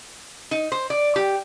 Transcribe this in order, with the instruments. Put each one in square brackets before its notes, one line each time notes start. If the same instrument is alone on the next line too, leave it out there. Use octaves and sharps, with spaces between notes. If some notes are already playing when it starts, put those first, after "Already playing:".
[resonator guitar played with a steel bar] D#4
C5
D5
G4